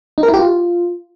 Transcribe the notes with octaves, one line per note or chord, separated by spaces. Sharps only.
D#4
A#4
E4
G4
F4